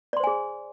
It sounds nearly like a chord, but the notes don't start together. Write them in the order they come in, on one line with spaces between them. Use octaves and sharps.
D5 C6 C5 G#5 G#4